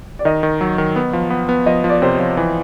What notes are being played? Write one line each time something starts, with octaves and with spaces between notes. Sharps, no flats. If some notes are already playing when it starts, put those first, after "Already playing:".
D5
D#3 D#5
D#3
F#3
D#3
B3
F3
B3
B3
F3 D#5
F3
D5
C3 C5
C#5
F3
E3